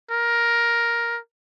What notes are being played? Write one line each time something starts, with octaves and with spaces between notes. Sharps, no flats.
A#4